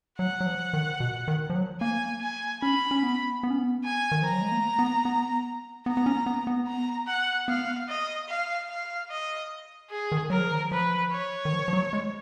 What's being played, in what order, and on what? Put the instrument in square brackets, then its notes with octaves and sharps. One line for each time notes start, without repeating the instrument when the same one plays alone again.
[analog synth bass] F#3 [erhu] F#5
[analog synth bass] F#3
F3
D#3
B2
D#3
F3
F#3
[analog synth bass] A#3 [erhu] G#5
[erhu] G#5
[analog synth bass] C#4 [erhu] B5
[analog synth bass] C#4
B3
B3
C#4
B3
[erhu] G#5
[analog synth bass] D#3
[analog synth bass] F3 [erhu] A#5
[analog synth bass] F#3
G#3
A#3
B3
B3
[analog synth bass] B3 [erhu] A#5
[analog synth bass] B3
C#4
B3
B3
[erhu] A#5
F#5
[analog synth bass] B3 [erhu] F5
[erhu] D#5
F5
F5
D#5
G#4
[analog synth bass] D#3
[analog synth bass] F#3 [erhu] A#4
[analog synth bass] F3
D#3
[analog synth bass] F3 [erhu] B4
[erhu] C#5
[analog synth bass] D#3
F3
F3
F#3
G#3